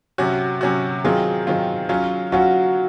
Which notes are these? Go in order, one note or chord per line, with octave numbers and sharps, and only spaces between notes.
C3 F#3 C#4 F#4
C3 F#3 C#4 F#4
D#3 F#3 C4 F4 G#4
D#3 F#3 C4 F4
F#3 C#4 F4
F#3 C#4 F4 F#4